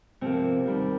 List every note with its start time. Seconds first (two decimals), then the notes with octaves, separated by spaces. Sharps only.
0.21 C3 F3 A#3 C4
0.66 D#2 D#3 G3 A#3